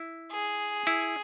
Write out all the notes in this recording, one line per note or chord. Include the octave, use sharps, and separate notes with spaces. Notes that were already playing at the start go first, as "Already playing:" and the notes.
Already playing: E4
G#4
E4